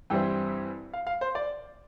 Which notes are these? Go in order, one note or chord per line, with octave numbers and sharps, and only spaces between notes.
G2 E3 G3 C4 E4 G5
F5
F5
C5
D5